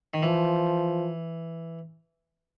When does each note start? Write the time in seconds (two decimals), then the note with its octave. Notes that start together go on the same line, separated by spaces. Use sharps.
0.14 D#3
0.23 E3 F3